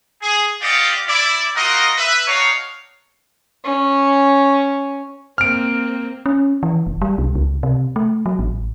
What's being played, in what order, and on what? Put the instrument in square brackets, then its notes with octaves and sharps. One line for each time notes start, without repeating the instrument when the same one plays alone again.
[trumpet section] G#4
F4 G4 D5 D#5 F5 F#5
E4 D5
C4 F4 F#4 A#4 D#5
B4 E5
D4 D#4 F#4 C#5 F5
[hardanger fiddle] C#4
[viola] A#3 C4 [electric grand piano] F6 D7
[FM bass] C#4
E3
F1
G3
C2
C#2
C3
A3
F#3
A1